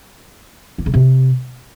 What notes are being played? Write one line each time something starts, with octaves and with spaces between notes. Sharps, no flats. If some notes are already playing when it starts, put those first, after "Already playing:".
A#3
C#3
C3